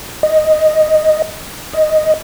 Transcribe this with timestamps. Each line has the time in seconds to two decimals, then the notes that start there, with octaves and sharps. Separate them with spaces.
0.23 D#5
1.73 D#5